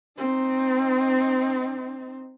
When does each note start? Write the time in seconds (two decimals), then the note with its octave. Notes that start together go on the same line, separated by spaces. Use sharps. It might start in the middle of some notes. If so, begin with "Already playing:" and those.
0.18 C4 D#4